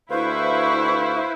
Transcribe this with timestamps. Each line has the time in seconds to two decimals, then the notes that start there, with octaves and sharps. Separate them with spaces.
0.11 D2 E4 B4 C5 F5 C#6